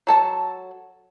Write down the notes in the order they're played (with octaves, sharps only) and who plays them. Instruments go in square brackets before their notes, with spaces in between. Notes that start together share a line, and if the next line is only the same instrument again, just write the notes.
[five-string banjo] F#3 A4 A5